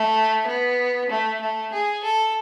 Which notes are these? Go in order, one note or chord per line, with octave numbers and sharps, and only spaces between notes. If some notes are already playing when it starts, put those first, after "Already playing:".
Already playing: A3
B3
A3
A3
G#4
A4